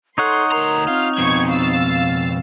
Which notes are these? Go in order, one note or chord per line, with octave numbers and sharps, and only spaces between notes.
D#4 A4 C#5 F#5 C6
D2 A#4 A#5
C4 F4 F6
F2 B2 C#6 G#6
F5 E6 A6